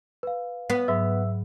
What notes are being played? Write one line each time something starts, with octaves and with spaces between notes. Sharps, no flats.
B4 F5
B3
G#2 F#3 B4 E5 E6